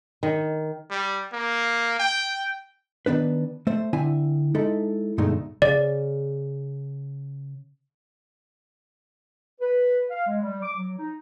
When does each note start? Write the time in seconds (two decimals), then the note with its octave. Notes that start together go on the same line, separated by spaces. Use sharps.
0.23 D#3
0.90 G3
1.32 A#3
2.00 G5
3.06 D#3 B3 D4 B4
3.67 A3 C5
3.93 D3 C4 E4 G#5
4.55 G#3 D#4 E4 A4
5.18 D2 G2 B2 G#3 A3 D#4
5.62 C#3 D5
9.60 B4
10.10 F5
10.27 G#3
10.42 G3
10.63 D6
10.78 F#3
10.97 D#4